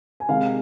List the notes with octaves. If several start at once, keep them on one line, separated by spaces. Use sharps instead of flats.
G#5
C3 D#3 G#3 F5